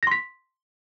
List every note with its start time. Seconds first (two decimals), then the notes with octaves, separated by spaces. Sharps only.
0.03 A#6
0.07 C6
0.11 B6